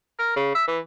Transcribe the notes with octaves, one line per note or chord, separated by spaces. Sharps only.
A#4
C#3
E5
E3